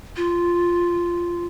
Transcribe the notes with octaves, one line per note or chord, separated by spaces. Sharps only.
F4